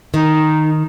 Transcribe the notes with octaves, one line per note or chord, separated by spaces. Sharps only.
D#3 D#4